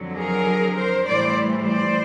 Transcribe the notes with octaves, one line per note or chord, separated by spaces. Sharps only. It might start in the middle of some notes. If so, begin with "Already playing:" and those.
Already playing: F2 D3 F#3
G#4 A#4
A#4 C5
A2 E3 G3 C5 D5
C5 D5